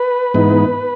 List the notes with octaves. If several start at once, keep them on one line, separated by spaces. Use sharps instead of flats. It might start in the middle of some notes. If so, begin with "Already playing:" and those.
Already playing: B4
G#2 E3 B3 D#4